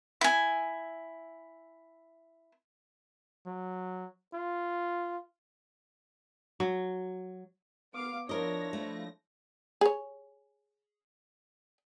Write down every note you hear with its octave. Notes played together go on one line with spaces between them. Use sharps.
E4 G#5
F#3
F4
F#3
B3 F5 D6
F3 D4 E4 A#4 C#5 D#5 A#6
A3
G#4 C#5